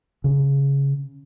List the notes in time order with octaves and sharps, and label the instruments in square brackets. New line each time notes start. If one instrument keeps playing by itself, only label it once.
[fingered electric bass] C#3